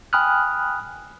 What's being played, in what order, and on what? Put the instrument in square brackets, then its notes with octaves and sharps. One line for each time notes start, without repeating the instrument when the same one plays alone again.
[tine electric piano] G5 G#5 B5 D#6 F6 F#6